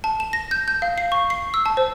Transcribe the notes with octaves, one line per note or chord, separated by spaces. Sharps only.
A5
E7
A#6
G6
G6
F5
C7
C#6
C7
E6
A5
C5